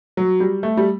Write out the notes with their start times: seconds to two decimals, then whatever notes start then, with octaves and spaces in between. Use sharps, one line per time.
0.17 F#3
0.40 G3
0.63 A3
0.77 G3